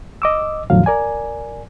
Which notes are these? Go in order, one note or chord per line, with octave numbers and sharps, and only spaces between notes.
D#5 D6 E6
E2 A2 D3 F3 F#3 F5
A#4 D5 G#5